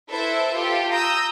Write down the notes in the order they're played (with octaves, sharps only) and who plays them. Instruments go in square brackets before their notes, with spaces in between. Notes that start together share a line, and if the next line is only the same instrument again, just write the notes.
[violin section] E4 A4 B4 C5 E5
F4 G4 A4
A#5 D#6 E6 G6